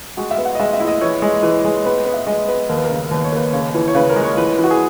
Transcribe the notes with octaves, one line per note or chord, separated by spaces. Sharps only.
G#3 F#4
E5
B3
F#5
D#5
G#3 E5
E5
E4
D#5
E3 C#5
G#3
E3
G#3
B3 B4
B3
E5
G#3 D#5
B3 B4
D#2 A#4
B4
A#4
C#3
D#2 B4
C#5
A#3 B4
C#3 C#5
E3
C#5
C#3 B4
A#4
G#3
C#5
E3 B4
E3
F#4
G#4